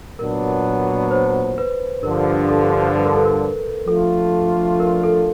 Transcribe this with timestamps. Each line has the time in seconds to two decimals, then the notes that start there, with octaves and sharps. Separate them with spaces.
0.19 A#2 F#3 B3 D4 A#4
1.11 C5
1.58 B4
2.03 G2 D3 F3 A#4
2.49 A4
2.96 B4
3.05 A#4
3.16 A4
3.25 A#4
3.87 F3 A3 D4 F4 A4
4.80 A#4
5.04 A4